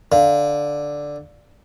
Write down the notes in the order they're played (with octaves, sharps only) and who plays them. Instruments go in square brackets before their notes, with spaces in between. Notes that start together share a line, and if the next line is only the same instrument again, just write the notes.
[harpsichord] D3 [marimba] F5